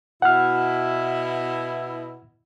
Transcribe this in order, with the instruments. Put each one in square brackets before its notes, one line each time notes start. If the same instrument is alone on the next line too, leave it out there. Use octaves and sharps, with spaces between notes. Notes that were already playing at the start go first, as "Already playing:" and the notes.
[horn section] B2 E4 [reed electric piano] F#5 F6